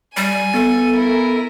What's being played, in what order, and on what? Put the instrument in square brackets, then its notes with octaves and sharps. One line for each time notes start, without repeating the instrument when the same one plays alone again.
[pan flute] G3 [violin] G#5 D#7
[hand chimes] B3 A6 [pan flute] A4
[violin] E4 A#4